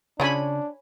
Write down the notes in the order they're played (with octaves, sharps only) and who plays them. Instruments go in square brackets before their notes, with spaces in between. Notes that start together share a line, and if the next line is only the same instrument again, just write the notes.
[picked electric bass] C#3 [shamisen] C#4 F4 G#4 [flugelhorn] D4 [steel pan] C#5 G#5 B5